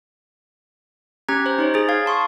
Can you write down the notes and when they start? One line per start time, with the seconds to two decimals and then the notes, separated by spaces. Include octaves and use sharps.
1.29 C#4 G4 A#5 G#6
1.46 C5 A#5
1.58 D#4 C5 C#5
1.74 G#4 A6
1.89 F5 G#6
2.06 A5 C6 C#6 D#6